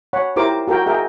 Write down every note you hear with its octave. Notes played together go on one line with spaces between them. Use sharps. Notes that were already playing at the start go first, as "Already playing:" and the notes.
C#5 F#5 B5
E4 G4 A#4 C5 D6
F#4 A4 A#4 G5
G#4 A#4 D#5 E5 G5